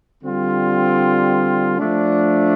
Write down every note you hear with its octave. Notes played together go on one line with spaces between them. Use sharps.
D3 G3 C4 F4
F3 A3 D4